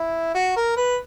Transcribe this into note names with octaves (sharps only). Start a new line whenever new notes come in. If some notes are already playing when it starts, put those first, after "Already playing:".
Already playing: E4
F#4
A#4
B4